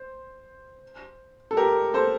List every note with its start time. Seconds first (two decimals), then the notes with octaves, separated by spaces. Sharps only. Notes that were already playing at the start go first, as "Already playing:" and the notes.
Already playing: C5
1.51 A4
1.57 G4 A#4
1.94 A4 C5